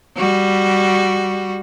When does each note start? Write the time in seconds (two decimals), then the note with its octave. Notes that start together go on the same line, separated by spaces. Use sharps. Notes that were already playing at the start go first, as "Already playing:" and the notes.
0.17 G3 F#4